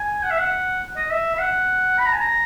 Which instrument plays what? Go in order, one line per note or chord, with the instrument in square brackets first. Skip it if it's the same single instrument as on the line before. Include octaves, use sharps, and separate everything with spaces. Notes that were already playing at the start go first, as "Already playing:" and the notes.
Already playing: [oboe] G#5
F#5
E5
F#5
D#5
E5
E5
F#5
B5
A#5
G#5
A#5